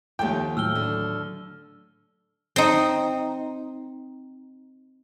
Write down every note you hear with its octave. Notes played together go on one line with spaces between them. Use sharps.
D#2 F3 A3 G5
A2 F#3 E6 F6 G7
D3
C4 D#4